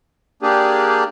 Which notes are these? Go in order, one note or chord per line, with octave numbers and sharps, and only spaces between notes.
A#3 D4 G4 G#4